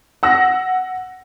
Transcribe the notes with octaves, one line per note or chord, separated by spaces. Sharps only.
F#5 E6 A#6